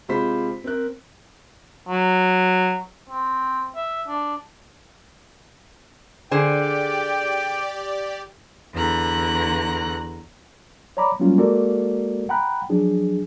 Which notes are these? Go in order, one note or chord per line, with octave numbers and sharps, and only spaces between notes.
C3 G#3 F4 C5 B5 B6
C4 A#4 F#6
F#3
C4
E5
D4
D3 G4 G#4 C5 D5 G5
E2 D3 A#5 F#6
C#5 D5 A#5 B5 D6
F#3 G3 A#3 C#4 F4
G#3 A#3 F#4 A4 A#4 D5
F#5 G5 A#5 B5 F#6
F3 F#3 D4 G#4